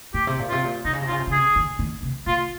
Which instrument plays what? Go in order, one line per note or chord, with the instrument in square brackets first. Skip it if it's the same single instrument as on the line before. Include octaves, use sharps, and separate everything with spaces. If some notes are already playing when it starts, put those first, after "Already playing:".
[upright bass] A#2 [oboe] G4
[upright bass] C3
A#2
[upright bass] C3 [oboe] F4
[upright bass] A#2
[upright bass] C3 [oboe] D#4
[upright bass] C#3
C3
[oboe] F4
[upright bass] C#3
C3
C#3
[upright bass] C3 [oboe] G#4
[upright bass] D#3
D#3
C3
[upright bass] A#2 [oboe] F4